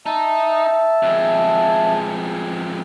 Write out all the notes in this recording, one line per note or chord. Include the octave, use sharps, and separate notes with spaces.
D#4 E5 A5
F2 G#3